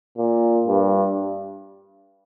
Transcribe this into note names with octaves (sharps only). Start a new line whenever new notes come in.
A#2
G2